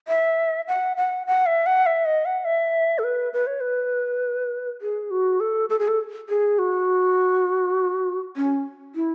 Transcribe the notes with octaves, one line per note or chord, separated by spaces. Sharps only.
E5
F#5
F#5
F#5
E5
F#5
E5
D#5
F#5
E5
A4
B4
B4
C#5
B4
G#4
F#4
A4
A4
G#4
A4
G#4
F#4
C#4
E4